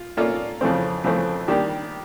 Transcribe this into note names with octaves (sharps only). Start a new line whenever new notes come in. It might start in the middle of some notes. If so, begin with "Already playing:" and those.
Already playing: F4
A#3 C#4 F4 A4 D5
F2 C#3 E3 A3 C4
F2 C#3 E3 A3 C4
D#3 G3 A#3 D4 G4